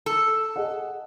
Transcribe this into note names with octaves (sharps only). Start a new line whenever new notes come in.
A4
G#4 D#5 F#5